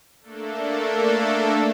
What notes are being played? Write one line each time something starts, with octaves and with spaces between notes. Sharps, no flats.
A3 A#3 D4 A4